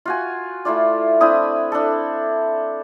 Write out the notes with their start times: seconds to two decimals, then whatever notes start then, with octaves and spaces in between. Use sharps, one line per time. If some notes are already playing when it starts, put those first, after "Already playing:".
0.05 F4 F#4 G#5
0.65 A3 E4 F4 D5
1.21 C4 D4 E4 D#6
1.72 D4 A4